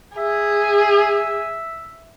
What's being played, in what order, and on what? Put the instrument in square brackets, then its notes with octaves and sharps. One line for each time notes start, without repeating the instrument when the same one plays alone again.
[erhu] G#4 [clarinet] E5